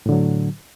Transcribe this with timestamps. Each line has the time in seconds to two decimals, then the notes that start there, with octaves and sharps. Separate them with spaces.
0.06 A2
0.09 D3
0.12 F#3